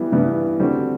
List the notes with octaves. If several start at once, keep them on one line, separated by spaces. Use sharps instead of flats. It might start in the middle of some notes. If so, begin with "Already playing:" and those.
Already playing: E3 G3 B3
G2 E3 G3 B3
D3 G3 C4 F#4